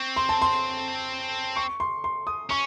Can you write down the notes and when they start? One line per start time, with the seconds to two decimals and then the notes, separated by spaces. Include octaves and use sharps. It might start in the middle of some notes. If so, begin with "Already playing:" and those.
Already playing: C4 C#6
0.16 C6
0.29 A5
0.42 C6
1.56 C#6
1.80 C6
2.04 C6
2.27 D#6
2.50 C#4 C#6